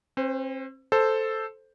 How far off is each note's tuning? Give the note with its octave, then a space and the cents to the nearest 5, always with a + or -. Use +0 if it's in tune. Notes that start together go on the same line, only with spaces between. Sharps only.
C4 +40 C5 -25
A4 +0 C5 +0